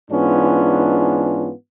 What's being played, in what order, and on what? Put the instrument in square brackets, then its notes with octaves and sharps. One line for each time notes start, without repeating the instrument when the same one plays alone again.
[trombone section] G#2 E3 B3 C#4 D4 F4